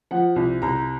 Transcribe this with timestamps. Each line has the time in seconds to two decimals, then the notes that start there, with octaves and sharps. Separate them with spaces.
0.11 F3 F#5
0.36 C2
0.62 C2 A#5